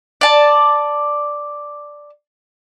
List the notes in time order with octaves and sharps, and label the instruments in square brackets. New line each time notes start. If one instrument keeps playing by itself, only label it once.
[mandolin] D5 A5